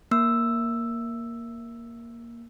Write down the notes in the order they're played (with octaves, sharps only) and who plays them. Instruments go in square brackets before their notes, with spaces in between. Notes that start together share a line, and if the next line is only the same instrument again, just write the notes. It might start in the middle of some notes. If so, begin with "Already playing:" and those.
[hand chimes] A#3 E6